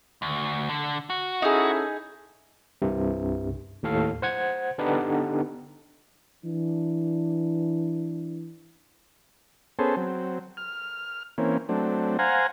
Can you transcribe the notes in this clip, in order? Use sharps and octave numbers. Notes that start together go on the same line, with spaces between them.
D2
D3
F#4
C#4 D#4 E4 G#4 A4
C2 G2 C3
D#2 A2 A4 F5
C5 F#5 G#6
D3 B3 D4 D#4 G4 B4
E3 D4
B3 C#4 G#4 A4 C5
F#3 C4
F6
E3 A#3 C4 C#4
F#3 A3 C4 D4
C5 F5 F#5 G#5 A#5